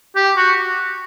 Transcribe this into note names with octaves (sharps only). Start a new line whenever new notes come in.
G4
F#4